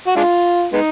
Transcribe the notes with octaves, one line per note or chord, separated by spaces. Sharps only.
F#4
G#3 D4 F4
G#3 B3 D#4